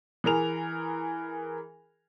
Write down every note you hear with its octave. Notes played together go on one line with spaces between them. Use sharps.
E3 G#4 A#4 F7